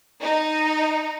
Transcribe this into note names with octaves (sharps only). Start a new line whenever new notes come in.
D#4